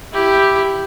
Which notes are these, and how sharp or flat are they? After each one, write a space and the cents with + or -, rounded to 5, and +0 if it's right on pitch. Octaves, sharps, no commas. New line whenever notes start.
E4 +0 G4 +0